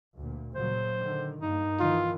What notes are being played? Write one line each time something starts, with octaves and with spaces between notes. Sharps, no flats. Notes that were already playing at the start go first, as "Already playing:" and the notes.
D2 A#2
A#2 C#3 F#3 C5
D3 D#3
G2 A#3 D#4
D#3 E3 F4